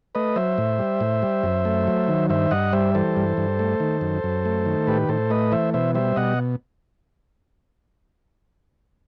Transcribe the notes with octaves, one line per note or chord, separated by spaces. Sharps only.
A3 B4 D#5
F#3 C5 E5
A2
G3
A2
G3
F#2
A3
F#3
D#3
G2 C5 E5
G2 D#5 F#5
G3 C5 E5
E3 A4 C5
G2
G2
A3
D#3
F#2
F#2
A3
D#3
A2 G4 B4
A2 A4 C5
A3 B4 D#5
E3 C5 E5
B2 C5 E5
G3 C5 E5
B2 D#5 F#5